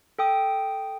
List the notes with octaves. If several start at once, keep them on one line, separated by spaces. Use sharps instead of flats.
A4 G5 D#6